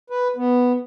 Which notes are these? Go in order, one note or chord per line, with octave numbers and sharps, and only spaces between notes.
B4
B3